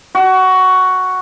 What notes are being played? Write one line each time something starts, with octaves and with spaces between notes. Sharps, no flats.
F#4